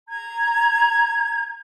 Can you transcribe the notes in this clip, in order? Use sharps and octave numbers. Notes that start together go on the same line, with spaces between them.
A#5 G#6